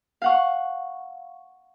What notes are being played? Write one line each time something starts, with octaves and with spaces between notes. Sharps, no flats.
F5 F#5 C#6